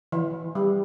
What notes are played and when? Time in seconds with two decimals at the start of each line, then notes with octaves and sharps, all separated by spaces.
0.12 E3
0.55 G3